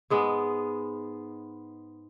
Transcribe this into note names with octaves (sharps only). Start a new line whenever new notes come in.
G#2 G#3 B3